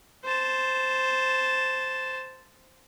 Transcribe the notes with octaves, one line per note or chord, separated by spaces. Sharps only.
C5 A5